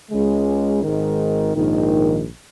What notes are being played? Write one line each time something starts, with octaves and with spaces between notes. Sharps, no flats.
C#2 C#3 G#3
G#1 G#2 D#3
A#1 G#2 D#3